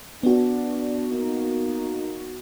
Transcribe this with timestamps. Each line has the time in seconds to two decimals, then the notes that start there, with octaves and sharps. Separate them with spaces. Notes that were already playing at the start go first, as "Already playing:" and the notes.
0.23 B3 D4 F#4
1.11 A#3 D#4